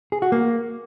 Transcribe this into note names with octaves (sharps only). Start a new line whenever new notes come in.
G#4
F#4
A#3